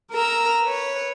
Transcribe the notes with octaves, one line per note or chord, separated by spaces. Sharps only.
A#4 A#5 E6
B4 C#5